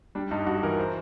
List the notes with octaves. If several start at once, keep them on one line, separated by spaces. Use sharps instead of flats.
G3 D4
G2 D#4
G2 F#4
E3 A#4
C5